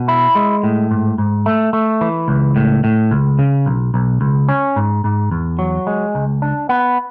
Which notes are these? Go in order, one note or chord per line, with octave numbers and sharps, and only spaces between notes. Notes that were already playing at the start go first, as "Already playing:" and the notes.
Already playing: B2
E4
G#3
A2
G#2
G#2
A3
A3
E3
C#2
A2
A2
C#2
C#3
B1
B1
C#2
C#4
G#2
G#2
E2
F#3
G#3
C#2
D4
B3